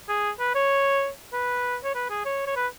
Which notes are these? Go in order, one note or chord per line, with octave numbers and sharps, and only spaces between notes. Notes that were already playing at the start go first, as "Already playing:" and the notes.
G#4
B4
C#5
B4
C#5
B4
G#4
C#5
C#5
B4